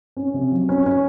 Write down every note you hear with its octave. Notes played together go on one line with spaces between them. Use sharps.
C#4
C3
F#3
C#4
C#4